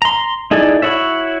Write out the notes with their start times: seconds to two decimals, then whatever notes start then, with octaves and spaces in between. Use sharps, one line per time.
0.02 A#5 C6
0.51 D#4 E4 G#4 A4 D5
0.82 E4 F#4 C#5 E5